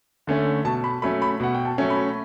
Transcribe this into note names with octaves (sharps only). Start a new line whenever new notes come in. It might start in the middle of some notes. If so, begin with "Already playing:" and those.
D3 A3 C#4
B2 A5
B5
F#3 A3 C#4 B5
B5
B2 F#5
G5
A5
F#3 A3 C#4
B5